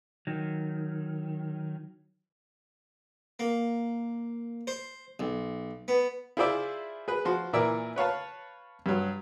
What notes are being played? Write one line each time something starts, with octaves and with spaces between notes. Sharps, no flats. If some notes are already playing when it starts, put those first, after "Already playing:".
D#3 F#3
A#3
C5
B1
B3
E4 F4 G#4 C5 D5 E5
G#4 B4
F3 F#4 C6
A#2 E3 A#4 D5 E5 E6
B4 C#5 F5 A5
G2 F#3